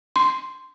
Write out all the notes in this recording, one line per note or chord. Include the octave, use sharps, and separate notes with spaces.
C6